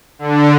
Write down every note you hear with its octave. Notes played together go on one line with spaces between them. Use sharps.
D3